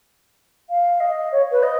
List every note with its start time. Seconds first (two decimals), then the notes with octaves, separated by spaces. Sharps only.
0.70 F5
1.00 D#5
1.32 C#5
1.52 B4
1.63 D#5